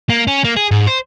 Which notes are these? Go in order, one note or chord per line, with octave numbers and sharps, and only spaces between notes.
A#3
C#4
A#3
G#4
G#2
C5